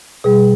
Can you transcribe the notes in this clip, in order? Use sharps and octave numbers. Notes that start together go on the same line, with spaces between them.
B2 G3 G#4